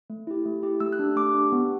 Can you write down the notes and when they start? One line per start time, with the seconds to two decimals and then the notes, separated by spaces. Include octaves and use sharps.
0.10 A3
0.27 E4 G4
0.46 A3
0.63 E4 G4
0.80 A3 E6
0.93 F#6
0.99 D4 G4
1.16 A3 D6
1.34 D4 G4
1.52 B3